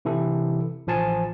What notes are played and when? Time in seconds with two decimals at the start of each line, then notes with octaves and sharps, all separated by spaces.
0.05 C3 E3 E4 A4
0.87 A1 F3 G#5 A5